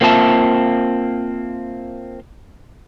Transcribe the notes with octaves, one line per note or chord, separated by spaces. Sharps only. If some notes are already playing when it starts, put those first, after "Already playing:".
A#3 C4 F4 E5 A5